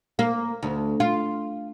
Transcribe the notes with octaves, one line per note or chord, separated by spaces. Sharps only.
A#3
D2
F4